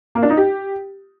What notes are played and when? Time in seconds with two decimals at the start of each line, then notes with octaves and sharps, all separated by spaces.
0.15 A#3
0.22 D4
0.30 D#4
0.37 G4